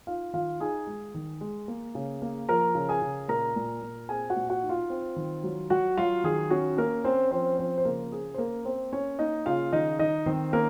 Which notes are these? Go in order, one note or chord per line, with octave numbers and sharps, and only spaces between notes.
D#4 F4 F5
D#3 F4 F5
D#4 G#4 G#5
G#3
D#3
G#3
A#3
C#3
A#3
F3 A#4 A#5
C#3
G#4 G#5
C#3
A#2 A#4 A#5
A#2
A#2
C4 G#4 G#5
F#4 F#5
A#2
F#4 F#5
D#4
F4 F5
C4
D#3
F#3
F#3 F#4 F#5
F#3 F4 F5
D#3 G#4
C#4 F#4
A#3 C#4 A#4
C4 C#4 C5
F3 C4 C5
F3 C4 C5
C5
C#3 A#3 A#4
C#4 G#4
C5
A#3 A#4
A#3 C4 C5
C#4 C#5
A#3 D#4 D#5
C#3 F4 F5
D#3 D#4 D#5
D#3 D#4 D#5
D#3 C4 C5
A#3 C#4 A#4